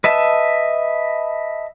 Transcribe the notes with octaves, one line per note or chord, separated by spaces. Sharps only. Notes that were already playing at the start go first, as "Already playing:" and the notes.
B4 D#5 E5 A5